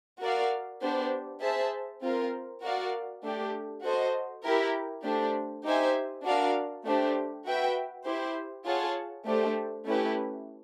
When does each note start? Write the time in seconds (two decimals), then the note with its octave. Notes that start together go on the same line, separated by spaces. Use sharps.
0.21 F#4 A#4 D5 F5
0.81 B3 D4 G4 C5
1.41 G#4 C5 E5 A5
2.02 C4 F4 A#4
2.62 F#4 A#4 D5 F5
3.23 A3 D4 G4
3.83 F#4 A4 C5 D#5
4.44 E4 G4 A#4
5.03 A3 D4 G4 C5
5.64 D#4 G4 C5 E5 G#5
6.24 D4 F#4 A#4 D5 F5
6.85 A3 D4 G4 C5
7.45 F#4 B4 E5 G5
8.05 E4 G4 C5
8.65 F4 G#4 C#5 F#5 A5
9.26 A3 D4 G4 C5
9.86 A3 C#4 E4 G4 B4